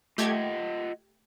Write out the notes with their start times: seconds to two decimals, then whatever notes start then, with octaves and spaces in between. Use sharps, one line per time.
0.18 A3 F4 G4 D#5 F#5 G#6